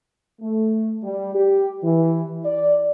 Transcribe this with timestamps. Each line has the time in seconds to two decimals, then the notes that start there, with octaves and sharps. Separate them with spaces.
0.41 A3
1.03 G3
1.35 G4
1.83 E3
2.45 D5